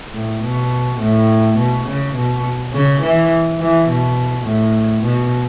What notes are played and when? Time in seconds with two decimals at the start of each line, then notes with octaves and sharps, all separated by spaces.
0.13 A2
0.42 B2
1.00 A2
1.57 B2
1.87 C#3
2.15 B2
2.73 C#3
3.02 E3
3.59 E3
3.88 B2
4.46 A2
5.03 B2